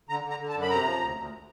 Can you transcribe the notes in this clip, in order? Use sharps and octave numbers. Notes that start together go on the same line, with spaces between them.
D3 A#5
D3
A#5
D3
A5
F#2
B5
C3 A#5
F3
D2
D2